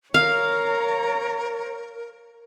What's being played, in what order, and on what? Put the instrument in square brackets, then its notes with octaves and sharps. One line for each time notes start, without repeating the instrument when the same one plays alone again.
[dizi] A#4 [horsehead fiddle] C#5 A#5 [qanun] F5